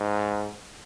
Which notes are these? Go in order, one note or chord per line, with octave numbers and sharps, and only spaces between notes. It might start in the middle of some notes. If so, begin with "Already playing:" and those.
Already playing: G#2